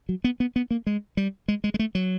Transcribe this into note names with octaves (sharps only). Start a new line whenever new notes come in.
F#3
B3
B3
B3
A#3
G#3
G3
G#3
G#3
G#3
A3
F#3